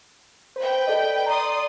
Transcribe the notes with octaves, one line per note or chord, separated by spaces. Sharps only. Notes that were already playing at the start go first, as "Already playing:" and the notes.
B4 C5 G5
A4 D5 D#5
D5 A#5 C6 D#6